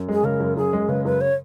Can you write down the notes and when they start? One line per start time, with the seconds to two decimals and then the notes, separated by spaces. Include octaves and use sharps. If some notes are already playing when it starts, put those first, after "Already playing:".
Already playing: F#2
0.09 G#3 G#4
0.24 C#3 A#4
0.40 F#2
0.57 F#2 G#4
0.73 G#3
0.89 C#3 B4
1.05 F#2 B4
1.21 C#5